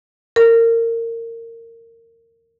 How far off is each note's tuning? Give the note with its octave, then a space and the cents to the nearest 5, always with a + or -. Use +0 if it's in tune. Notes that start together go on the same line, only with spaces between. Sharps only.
A#4 -25